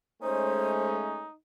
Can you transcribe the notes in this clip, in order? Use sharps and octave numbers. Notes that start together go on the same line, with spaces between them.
G#3 A3 C#4 D#4 C5